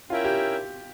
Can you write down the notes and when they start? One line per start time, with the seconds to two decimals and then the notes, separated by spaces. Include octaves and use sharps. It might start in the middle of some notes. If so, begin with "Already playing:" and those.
0.10 C#4 E4 F4 A#4 E5 G5
0.25 G4